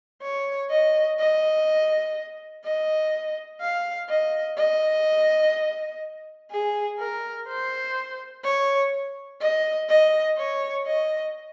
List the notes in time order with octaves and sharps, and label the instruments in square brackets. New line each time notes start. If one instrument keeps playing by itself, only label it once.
[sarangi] C#5
D#5
D#5
D#5
F5
D#5
D#5
G#4
A#4
C5
C#5
D#5
D#5
C#5
D#5